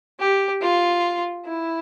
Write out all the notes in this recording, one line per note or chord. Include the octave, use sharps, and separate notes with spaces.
G4
F4
E4